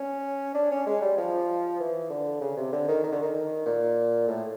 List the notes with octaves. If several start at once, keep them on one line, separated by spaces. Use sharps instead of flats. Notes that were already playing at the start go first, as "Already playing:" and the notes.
Already playing: C#4
D4
C#4
G#3
G3
F3
E3
D3
C#3
C3
D3
D#3
D#3
D3
D#3
D#3
A#2
A2